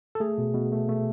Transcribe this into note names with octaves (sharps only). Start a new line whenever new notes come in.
A4
A3 G#4
B2
B2
A3
A3